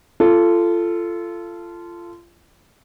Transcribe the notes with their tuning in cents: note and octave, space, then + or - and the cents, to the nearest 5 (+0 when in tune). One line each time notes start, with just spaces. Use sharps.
F4 -25 A4 +0